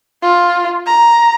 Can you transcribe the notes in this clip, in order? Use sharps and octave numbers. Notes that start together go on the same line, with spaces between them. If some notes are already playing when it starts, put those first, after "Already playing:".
F4
A#5